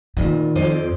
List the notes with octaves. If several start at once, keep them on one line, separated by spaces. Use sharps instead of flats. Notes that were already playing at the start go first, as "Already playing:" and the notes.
D2 A#2 D#3
F2 C5 D5 D#5